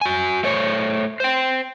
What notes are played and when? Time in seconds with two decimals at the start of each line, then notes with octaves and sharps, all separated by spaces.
0.01 F#4 G#5
0.43 A3 C5 C#5
1.20 C5 G5